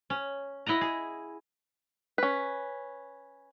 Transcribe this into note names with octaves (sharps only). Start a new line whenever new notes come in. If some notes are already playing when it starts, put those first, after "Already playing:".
C#4
E4 D#5 F#5 A#5
G#4
C#4 B4